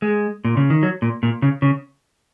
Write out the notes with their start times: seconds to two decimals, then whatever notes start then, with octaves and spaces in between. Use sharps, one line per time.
0.02 G#3
0.45 A#2
0.57 C#3
0.70 D#3
0.83 F#3
1.02 A#2
1.23 A#2
1.42 C#3
1.62 C#3